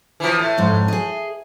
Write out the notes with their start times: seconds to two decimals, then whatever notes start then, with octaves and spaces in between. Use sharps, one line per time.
0.20 E3 F3
0.39 A2
0.58 F2 G#2
0.88 G#4 D#5